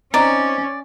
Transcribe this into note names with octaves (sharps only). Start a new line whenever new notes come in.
C4 C#4 D#4 D5 D#5 A#5